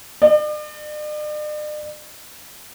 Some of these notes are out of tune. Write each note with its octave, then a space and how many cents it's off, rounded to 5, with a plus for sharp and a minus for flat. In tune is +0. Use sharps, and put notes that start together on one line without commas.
D5 +45